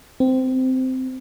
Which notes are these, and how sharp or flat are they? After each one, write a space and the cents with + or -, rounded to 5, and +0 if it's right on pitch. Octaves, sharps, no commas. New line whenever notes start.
C4 -15